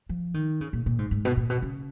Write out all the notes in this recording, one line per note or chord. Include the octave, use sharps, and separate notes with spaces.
F3
D#3
C#3
A#2
A#2
G#2
G#2
B2
A#2
B2
C#3